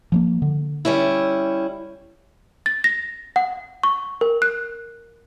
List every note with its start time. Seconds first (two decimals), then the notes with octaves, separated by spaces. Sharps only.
0.12 F3 G3 A#3
0.42 D3
0.85 G3 C#4 E4
2.66 A6
2.84 A#6
3.36 F#5
3.83 C#6
4.21 A#4
4.42 F#6